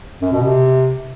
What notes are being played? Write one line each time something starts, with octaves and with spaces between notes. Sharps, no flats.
F#2
B2
C3